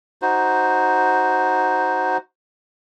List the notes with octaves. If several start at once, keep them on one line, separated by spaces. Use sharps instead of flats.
D#4 F#4 C5